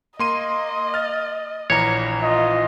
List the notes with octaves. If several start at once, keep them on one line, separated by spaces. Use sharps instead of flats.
A#3 D#5 C6 D#7
F6 A6
A#1 E3 C#5 A#5
F4 D#5